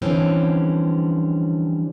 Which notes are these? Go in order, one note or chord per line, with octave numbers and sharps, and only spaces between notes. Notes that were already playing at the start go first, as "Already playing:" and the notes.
D3 E3 F3 G3 C4 C#4